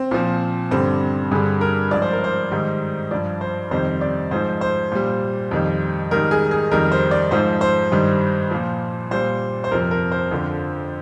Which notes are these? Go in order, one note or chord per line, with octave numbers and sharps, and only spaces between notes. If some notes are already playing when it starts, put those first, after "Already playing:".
Already playing: C4
A#2 F3
G2 D3 G3 C4
G2 D3 G3 G#4
A#4
G#2 F3 D5
C5
A#4
C5
G#2 D#3 G3
G2 F3 D5
C5
F2 C3 D#3 G3 C5
D5
G#2 F3 C5
C5
A#2 G3
F2 D#3 G3
G#2 D#3 G3 A#4
G#4
G#4
F2 D#3 G3 A#4
C5
D5
G#2 F3 C5
C5
G2 D#3 G3
A#2 F3
A#2 G3 C5
C5
F2 C3 F3 A#4
A#4
C5
F2 D3 F3